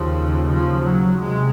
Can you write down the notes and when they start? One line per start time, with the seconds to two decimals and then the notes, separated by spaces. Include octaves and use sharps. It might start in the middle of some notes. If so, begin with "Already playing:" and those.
Already playing: D#2 C#3 F3
0.50 F3
0.85 F#3
1.21 C3 G#3